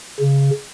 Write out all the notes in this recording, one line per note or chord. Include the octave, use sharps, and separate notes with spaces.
C#3